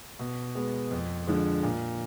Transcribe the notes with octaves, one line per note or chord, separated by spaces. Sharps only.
B2
G#3 B3
F2
D3 F3 G#3
A#2